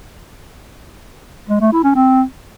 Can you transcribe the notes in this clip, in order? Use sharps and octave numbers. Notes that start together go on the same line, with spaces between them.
G#3
A3
E4
C#4
C4